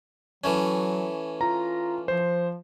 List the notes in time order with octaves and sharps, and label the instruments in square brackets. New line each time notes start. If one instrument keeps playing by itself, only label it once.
[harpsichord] E3 A3 C#4 [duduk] F#3
[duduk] F4 [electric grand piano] A#5
[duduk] F3 [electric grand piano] C5